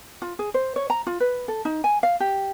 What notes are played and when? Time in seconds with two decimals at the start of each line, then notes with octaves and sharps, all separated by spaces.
0.22 F4
0.39 G#4
0.54 C5
0.76 C#5
0.90 A#5
1.07 F4
1.20 B4
1.48 A4
1.65 D#4
1.84 G#5
2.03 F5
2.20 G4